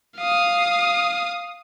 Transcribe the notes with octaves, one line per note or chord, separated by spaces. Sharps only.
F5 D#6